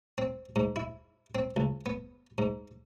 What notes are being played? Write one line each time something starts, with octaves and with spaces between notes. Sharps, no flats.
C4
G#2
E4
C4
C#2
B3
G#2